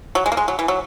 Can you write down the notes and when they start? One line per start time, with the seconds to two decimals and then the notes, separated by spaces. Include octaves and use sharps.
0.15 F#3
0.26 G#3
0.32 A#3
0.37 G#3
0.48 F#3
0.59 E3
0.68 F#3